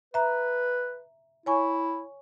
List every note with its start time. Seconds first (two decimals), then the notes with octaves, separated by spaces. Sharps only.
0.14 B4 E5 A#5
1.46 E4 C#5 G#5 C#6